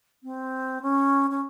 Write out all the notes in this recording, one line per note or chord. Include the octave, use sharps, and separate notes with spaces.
C4
C#4
C#4